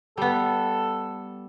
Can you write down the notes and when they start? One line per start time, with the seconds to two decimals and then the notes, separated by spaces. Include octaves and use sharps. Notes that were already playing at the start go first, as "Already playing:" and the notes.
0.17 G3 B3 A4